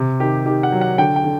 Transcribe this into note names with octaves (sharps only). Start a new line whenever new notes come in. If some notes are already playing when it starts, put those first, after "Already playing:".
Already playing: C3
D#3 G4
D#3 G4
F#5
F#3
F#5
D3 G5
G5
D3